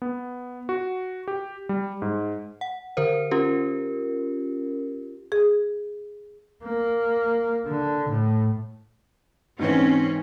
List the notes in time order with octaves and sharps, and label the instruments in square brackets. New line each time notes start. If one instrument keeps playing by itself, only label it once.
[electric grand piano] B3
F#4
G4
G3
G#2
[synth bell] F#5
D3 A#4 C5
C#4 F4 G4 A#4
[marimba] G#4
[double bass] A#3
D3
A2
[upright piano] G#2 E3 [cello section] C4 C#4